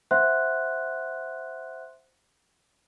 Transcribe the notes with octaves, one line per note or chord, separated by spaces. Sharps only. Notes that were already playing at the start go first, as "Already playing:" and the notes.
C5 E5 F#5 C6 F#6